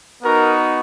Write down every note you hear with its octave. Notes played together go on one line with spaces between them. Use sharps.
B3 D#4 F#4 A#4